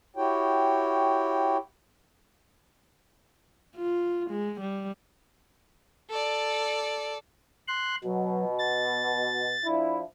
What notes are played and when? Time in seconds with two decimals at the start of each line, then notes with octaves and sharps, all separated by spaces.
0.16 E4 F#4 G4 C#5 G5
3.76 F4
4.31 G#3
4.61 G3
6.10 A4 D5
7.68 C6 F#6
8.04 B2 F#3
8.59 A6
9.65 F3 D4 E4